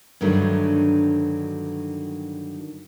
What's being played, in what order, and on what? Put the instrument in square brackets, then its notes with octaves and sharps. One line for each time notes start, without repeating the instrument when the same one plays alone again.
[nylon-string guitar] G2 D3 D#3 F#3 A3